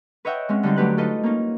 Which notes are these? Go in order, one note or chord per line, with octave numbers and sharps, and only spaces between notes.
B4 C#5 D#5 E5 F#5 G5
G#3 C4 C#4
D3 G3 C4 D#4 C5
F#3 A3 G4 B4 F#6
D#4 F4 A4 B4 D#5
A#3 C#4 D#4